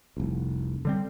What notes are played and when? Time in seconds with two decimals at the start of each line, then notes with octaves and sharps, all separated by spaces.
0.17 F1 C2
0.85 D3 G3 C4